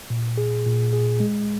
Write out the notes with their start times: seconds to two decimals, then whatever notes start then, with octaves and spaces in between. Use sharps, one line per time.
0.10 A#2
0.38 G#4
0.66 A#2
0.93 G#4
1.20 G#3